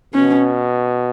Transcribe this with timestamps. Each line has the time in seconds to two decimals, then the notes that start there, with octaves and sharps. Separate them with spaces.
0.14 B2 C#4